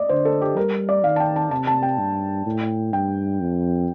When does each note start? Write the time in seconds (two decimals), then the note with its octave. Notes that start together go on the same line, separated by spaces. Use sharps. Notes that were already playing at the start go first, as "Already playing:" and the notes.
Already playing: D5 D#5
0.09 D3 C5
0.25 A4
0.42 G4
0.56 G3 A#4
0.89 D5
1.04 D#3 F5
1.16 A5
1.20 G5
1.36 A5
1.51 C3 A5
1.67 A5
1.83 G5
1.99 G2
2.46 A2
2.93 G2 G5
3.40 F2